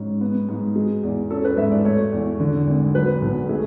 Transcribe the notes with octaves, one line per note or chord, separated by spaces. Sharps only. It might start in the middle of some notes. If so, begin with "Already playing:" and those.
Already playing: G#2 C#4
B3
G#2
G#3
E2
C#4 A4
B4
G#2 E5
D5
A3 C#5
E2
D3
G#1
F#3 B4
B1
A3 G#4